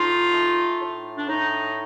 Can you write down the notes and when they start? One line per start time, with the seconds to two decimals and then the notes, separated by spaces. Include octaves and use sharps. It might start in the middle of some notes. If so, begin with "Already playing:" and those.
Already playing: A2 D#4 F4
0.34 A3
0.81 A2
1.17 D4
1.28 A2 D#4